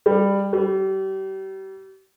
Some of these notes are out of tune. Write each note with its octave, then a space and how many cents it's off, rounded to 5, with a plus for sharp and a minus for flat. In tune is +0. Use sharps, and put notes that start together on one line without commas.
G3 +15
G3 -35